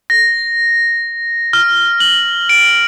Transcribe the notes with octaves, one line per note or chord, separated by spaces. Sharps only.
A#6
F6
F#7
D7